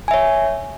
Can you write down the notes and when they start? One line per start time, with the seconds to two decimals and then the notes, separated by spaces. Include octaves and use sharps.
0.08 G#5
0.11 E5
0.14 C#5